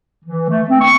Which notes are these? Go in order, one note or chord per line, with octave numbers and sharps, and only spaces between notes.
E3
A3
C4
C#6